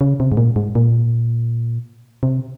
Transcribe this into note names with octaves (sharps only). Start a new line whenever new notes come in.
C#3
C3
G#2
A#2
G#2
A#2
C3